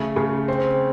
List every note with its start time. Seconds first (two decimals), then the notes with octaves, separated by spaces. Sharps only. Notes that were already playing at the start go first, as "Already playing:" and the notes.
Already playing: C#3 A3
0.16 C#3
0.48 C4